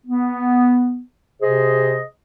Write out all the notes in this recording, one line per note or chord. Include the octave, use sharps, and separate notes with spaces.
B3
C3 G#4 C5 D#5